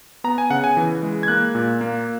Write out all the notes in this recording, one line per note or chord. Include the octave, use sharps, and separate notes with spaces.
B3 A#5
G#5
C#3 F#5
G#5
E3
G#3
G#6
A#3 F#6
A#2
A#3